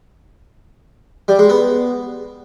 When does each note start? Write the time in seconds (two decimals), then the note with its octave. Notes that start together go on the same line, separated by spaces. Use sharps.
1.28 G3
1.39 G#3
1.49 B3